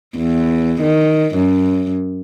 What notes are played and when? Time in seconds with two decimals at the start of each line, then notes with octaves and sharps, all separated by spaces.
0.17 E2
0.82 D#3
1.35 F#2